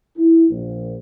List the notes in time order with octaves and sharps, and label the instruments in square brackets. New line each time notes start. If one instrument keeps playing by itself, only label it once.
[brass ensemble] E4
A#1